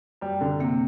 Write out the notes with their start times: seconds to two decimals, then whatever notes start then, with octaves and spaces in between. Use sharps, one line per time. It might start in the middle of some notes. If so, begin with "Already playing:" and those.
0.22 F#2 G3
0.41 F#2 D3
0.60 C3 A#3